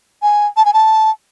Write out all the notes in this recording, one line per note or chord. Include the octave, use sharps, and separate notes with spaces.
G#5
A5
G#5
A5